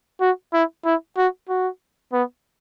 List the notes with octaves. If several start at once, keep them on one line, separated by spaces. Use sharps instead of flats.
F#4
E4
E4
F#4
F#4
B3